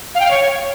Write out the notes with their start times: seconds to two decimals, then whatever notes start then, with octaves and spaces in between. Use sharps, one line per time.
0.15 F5
0.20 G5
0.25 F5
0.31 C#5